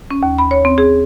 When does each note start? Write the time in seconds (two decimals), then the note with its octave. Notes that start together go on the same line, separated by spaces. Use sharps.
0.11 C#4
0.23 D#2
0.38 B5
0.51 C#5
0.65 C4
0.78 G#4